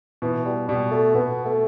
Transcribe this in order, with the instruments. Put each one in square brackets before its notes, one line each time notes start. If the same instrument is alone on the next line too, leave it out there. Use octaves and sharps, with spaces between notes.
[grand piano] B2 [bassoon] E3
[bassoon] G3
[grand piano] B2 [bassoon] G3
[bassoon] A3
[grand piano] B2 [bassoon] B3
[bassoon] A3